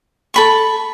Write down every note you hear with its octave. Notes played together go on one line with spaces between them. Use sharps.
A4 B5 C#6